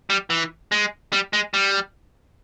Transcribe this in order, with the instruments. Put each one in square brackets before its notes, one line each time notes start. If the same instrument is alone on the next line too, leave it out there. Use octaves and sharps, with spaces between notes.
[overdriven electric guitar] G3
E3
G#3
G3
G#3
G3